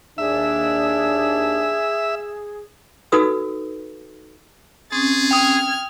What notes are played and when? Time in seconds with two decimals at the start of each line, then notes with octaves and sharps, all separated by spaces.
0.18 D#2 D4 G#4 E5
3.12 D#4 F#4 A4 B4 D#6 E6
4.92 C4 C#4 G#4 A6
5.31 G5 D#6 F6 G#6